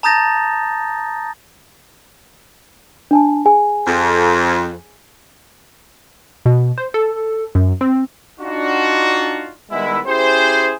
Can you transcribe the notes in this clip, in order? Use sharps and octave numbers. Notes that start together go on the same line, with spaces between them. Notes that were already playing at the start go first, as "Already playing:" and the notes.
A5 A#5 D#6 G6 A6 A#6
D4 G#5 A5
G#4 G#5
F2
B2
C5
A4
F#2
C4
D4 D#4 F4 F#4
D#3 G3 G#3 B3 E4
C#4 E4 G4 G#4 C5